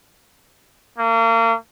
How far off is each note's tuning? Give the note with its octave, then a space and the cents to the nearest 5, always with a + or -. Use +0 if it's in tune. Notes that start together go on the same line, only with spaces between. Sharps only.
A#3 -35